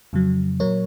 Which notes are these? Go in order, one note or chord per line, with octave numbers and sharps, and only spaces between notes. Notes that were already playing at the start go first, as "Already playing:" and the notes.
F2 C#3 F#3
A#2 F#3 A#4 C#5